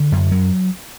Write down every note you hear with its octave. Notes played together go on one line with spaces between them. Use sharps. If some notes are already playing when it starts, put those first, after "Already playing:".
Already playing: D3
F#2
F#3